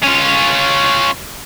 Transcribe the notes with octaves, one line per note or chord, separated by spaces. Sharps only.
C#4 F4